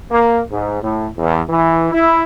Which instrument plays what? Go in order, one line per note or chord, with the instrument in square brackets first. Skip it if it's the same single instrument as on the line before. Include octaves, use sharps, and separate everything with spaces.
[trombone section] A#3
G#2
A2
E2
E3
E4